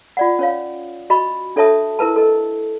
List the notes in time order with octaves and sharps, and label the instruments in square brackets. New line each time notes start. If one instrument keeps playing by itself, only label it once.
[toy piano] F4 D5 F#5
C#4 C#5 F5
F#4 D#5 B5 C#6
D4 A4 C#5 E5 A5 D#6
E4 A#4 B4 A5
A4 A#4 D#5